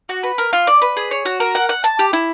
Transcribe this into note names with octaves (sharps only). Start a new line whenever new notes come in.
F#4
B4
A#4
F4
D5
B4
G#4
C#5
F#4
A#4
F#5
F#5
A5
G4
E4